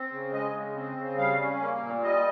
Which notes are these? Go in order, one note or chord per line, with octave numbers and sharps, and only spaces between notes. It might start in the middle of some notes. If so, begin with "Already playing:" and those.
Already playing: C4
C#3
G#3 D#5
C#3
C4
C#3
G3 F5
C#4
A#3
A#2
G3 D#5